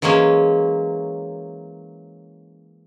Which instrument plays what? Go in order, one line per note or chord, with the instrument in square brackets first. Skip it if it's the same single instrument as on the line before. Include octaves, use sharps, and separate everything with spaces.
[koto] E3 F#3 G#3 A#3 C#4